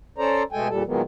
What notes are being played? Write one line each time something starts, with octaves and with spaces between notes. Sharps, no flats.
C#4 A4 C5 D5 A#5
B2 G#3 A3 A4 G5 G#5
E2 A#2 G3 A4
A#2 D#3 F#3 G#3 A#3 B3